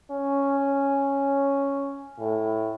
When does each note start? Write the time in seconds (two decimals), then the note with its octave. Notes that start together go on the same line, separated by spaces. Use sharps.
0.11 C#4
2.20 A2